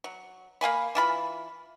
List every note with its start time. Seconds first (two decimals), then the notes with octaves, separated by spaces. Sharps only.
0.04 F#3
0.61 A#3 F5 G#5 B5
0.95 E3 F4 B5